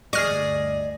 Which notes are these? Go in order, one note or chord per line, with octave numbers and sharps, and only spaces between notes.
D2 G2 G#4 D5 D#5 C#6 F6